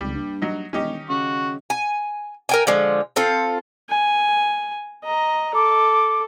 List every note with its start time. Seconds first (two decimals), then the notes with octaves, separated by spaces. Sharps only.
0.01 G#1 C#2 G3
0.15 G2 A#3
0.42 F#3 D#4
0.73 E1 D#3 G3 C#4 D#4 G4
1.09 C#3 F#4
1.70 G#5
2.49 A#4 G5 G#5
2.67 D3 F3 G#3
3.16 C4 F4 A4
3.90 G#5
5.05 D#5 A#5
5.55 A4 D6